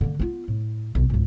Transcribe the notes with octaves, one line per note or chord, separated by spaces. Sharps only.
D3 A#3
B3 F4
A2
B1
G#1 C#2